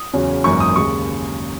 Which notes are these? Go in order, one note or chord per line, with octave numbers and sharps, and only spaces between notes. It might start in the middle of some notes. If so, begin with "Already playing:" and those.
Already playing: D#6
E2 C#3 F#3 C#4
G#1 F#2 E3 A#3 C#6
D#6
D#2 C#3 G#3 C#6